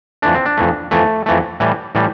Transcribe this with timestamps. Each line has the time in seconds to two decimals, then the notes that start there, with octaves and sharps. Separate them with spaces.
0.22 F2 E3 A3 D4
0.34 C4
0.46 D4
0.57 F2 E3 A3
0.91 F2 E3 A3
1.26 F2 E3 A3
1.60 A2 E3 G3
1.95 A2 E3 G3